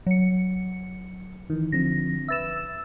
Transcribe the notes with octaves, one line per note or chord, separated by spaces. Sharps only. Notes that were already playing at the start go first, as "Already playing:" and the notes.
F#3 C#7
D#3 E3
D3 F3 C4 A#6
B4 E5 E6 A6 E7